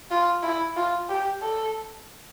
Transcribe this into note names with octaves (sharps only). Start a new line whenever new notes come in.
F4
E4
F4
G4
A4